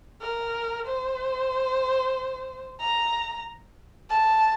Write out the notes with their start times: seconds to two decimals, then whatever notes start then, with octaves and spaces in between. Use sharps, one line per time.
0.21 A#4
0.87 C5
2.80 A#5
4.10 A5